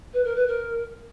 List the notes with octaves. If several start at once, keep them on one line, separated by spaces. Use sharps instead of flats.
B4
A#4
B4
A#4